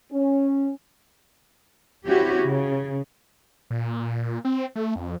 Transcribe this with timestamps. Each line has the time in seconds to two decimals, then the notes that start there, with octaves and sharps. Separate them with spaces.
0.13 C#4
2.06 C4 C#4 E4 F#4 G4
2.42 C#3
3.70 A#2
4.45 C4
4.76 A3
4.96 F2